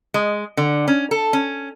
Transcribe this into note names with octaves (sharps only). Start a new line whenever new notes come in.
G#3
D3
C#4
A4
C#4